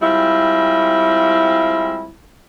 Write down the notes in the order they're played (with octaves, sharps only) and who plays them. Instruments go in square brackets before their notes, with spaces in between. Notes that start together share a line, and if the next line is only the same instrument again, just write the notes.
[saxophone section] G3 G#3 C4 E4 F4